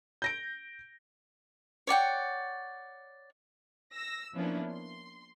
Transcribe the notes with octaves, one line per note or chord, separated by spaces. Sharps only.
G6 A#6 D7
C#5 D5 F#5 G5
E6 A#6
F3 A#3 B3 C#4 D4 E4
C6